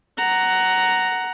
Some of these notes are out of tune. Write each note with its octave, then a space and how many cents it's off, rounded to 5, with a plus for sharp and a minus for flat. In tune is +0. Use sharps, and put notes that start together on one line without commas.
F#5 +10 A#5 +0